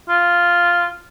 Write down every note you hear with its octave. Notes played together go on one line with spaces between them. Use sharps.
F4